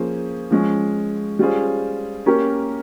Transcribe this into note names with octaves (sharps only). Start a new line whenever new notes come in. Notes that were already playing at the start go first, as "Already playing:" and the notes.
Already playing: F3 A#3 C#4 G#4 C5
F3 G#3 C#4
G3 C#4 F4 G#4 C5
A#3 C#4 G4 A#4